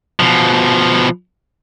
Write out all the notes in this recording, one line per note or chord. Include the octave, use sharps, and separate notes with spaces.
B2 F3